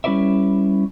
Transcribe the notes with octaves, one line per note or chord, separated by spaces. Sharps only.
G3 C#4 E4 B4 D5 E5